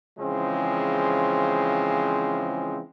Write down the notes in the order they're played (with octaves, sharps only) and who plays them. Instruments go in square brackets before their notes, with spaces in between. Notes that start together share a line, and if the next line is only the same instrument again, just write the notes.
[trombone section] C#3 E3 F3 G#3 C4